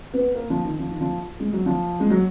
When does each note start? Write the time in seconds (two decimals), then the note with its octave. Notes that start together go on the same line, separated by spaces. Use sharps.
0.14 B3
0.35 A#3
0.50 F3
0.64 D#3
0.79 F3
0.91 D#3
1.01 F3
1.40 G#3
1.53 F#3
1.66 F3
2.00 G#3
2.10 F#3